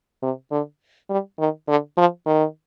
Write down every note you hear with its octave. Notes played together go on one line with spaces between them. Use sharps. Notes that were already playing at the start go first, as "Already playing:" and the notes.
C3
D3
G3
D#3
D3
F3
D#3